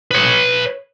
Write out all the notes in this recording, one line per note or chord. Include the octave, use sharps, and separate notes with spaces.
B4 C#5